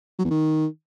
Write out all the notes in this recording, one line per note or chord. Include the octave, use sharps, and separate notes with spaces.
F#3
E2
D#3